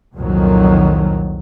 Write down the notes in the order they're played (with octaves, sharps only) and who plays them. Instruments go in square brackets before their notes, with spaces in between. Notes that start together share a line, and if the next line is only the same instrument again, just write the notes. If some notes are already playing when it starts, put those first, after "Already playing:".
[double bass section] C2 F2 A#2 D#3 F#3